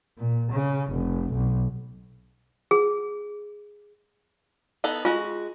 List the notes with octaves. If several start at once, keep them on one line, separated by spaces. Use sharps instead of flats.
A#2
C#3
F1
B1
G#4
B3 D#4 A4
G#3 F4 F#4